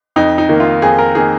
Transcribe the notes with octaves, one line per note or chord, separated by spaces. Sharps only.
F2 D#4
D#4
D#3 A#3
F4
F2 G#4
A#4
D#3 A#3 G#4